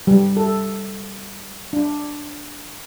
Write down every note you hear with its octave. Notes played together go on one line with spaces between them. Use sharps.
G3
A4
D4